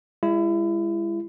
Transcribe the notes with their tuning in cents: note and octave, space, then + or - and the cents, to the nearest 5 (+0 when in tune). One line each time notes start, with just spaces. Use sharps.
G#3 -30 E4 +30